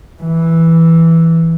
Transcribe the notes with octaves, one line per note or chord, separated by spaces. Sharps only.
E3